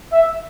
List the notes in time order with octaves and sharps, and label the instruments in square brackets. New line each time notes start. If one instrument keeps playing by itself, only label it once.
[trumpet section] E5